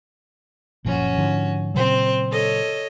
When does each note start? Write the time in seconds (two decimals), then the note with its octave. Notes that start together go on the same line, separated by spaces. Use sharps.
0.85 F#1 A#2 F3 C#4 F#4
1.18 G#2 D3 F3
1.74 A#2 C#3 F#3 C4 C5
2.31 A4 C#5 D#5